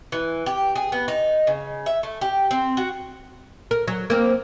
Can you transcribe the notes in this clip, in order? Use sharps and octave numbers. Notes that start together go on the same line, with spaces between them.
E3
G4
G#4
B3
D#4
C#3
E5
A3
G4
C4
F#4
A#4
F#3
A#3 C4